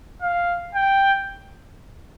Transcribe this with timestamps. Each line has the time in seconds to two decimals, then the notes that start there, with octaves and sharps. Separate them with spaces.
0.22 F5
0.75 G5